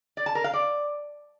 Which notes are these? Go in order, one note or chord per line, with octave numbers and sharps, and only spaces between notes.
D5
A5
A#4
F5
D5